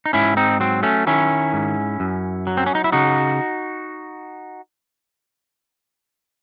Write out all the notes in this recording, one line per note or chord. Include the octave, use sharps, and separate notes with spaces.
D#4
G#2 C#4 E4
C4 D#4
F#3 C4
A3 C#4
D#3 C#4 E4
G#2
F#2
F#3
C4
C#4
D#4
E4
C#3 D#4 F#4